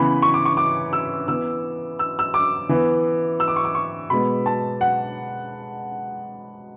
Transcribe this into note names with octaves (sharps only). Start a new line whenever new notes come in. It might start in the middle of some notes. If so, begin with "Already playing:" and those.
Already playing: C#3 E3 B3 B5
C#6
D6
C#6
D6
E6
E3 B3 E6
E6
E6
D6
E3 B3
E6
D6
C#6
D6
C#6
B2 G#3 B3 B5
A5
F#5